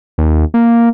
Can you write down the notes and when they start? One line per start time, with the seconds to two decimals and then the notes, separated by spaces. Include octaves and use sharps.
0.18 D#2
0.54 A#3